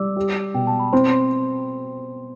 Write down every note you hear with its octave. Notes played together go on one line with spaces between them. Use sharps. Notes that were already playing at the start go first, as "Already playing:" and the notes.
Already playing: G3 D5 D6 E6
G4
B2 G5
A5
B5
C4 C5 C6
C5 C6